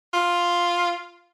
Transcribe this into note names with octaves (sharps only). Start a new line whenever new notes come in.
F4